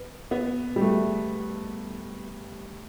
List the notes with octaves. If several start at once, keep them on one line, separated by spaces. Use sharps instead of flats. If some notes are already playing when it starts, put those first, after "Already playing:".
Already playing: B3
B3
G3
A3